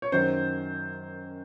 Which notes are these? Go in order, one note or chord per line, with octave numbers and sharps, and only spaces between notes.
C#5
F#2 D#3 F#3 C5